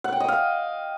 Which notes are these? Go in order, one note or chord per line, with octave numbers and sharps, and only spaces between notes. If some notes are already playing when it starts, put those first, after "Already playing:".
F#5
G5
D#5
F5